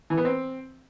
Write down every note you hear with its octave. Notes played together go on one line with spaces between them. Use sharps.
E3
B3
C4